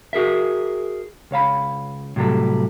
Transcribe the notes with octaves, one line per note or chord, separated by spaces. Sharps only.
F#4 G#4 A#4 E5
C#2 C#5 F5 B5
A2 C3 F#3 G3 A4